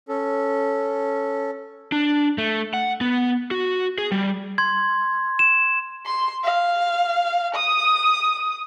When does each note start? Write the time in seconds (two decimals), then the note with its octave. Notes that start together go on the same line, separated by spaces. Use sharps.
0.09 C#4 A4
1.92 D4
2.38 A3
2.74 F#5
3.01 B3
3.51 F#4
3.98 G#4
4.12 G3
4.58 C6 G#6
5.39 E7
6.06 C6
6.44 F5
7.55 D#6